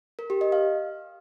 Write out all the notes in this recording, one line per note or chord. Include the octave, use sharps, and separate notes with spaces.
A#4
G4
D#5
F5